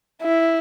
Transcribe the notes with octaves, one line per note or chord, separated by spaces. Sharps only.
E4